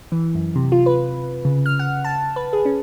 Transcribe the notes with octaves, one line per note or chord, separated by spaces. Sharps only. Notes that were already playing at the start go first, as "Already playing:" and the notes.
E3
F#2
C3
F4
B4
C#3
F6
F#5
A5
B4
G#4
C#4